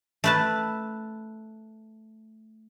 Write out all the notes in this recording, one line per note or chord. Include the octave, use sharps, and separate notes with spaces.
A3 B4 A5